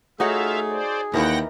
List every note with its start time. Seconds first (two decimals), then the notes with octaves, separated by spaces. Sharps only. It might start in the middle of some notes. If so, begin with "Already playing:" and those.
0.20 A3 D#4 F4 F#4 G#4 C#5 E5 F5
0.70 C5 D5
1.14 D#2 E3 D#4 A#4 F#5 G5 A#6